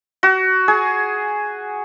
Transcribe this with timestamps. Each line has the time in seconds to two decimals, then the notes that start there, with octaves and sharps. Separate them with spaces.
0.23 F#4
0.68 G#4